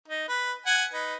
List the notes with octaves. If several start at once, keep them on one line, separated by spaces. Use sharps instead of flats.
D#4
B4
F#5 G#5
D#4 B4